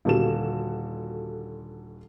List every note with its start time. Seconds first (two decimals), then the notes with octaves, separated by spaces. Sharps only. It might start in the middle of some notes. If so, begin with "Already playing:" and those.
0.05 D#1 D3 F#4 G4 A4 E7